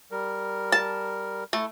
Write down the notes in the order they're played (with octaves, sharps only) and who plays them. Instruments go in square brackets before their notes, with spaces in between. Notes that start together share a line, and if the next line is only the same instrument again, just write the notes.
[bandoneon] G3 A#4
[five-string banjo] A5
[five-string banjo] A3 [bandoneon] E4